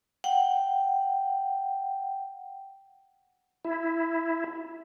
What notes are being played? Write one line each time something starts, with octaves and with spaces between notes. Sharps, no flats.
F#5 G5
E4